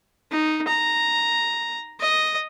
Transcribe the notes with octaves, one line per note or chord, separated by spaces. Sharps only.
D#4
A#5
D#5